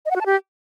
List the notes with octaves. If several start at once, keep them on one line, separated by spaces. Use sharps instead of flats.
D#5
F#5
F#4
A5
G4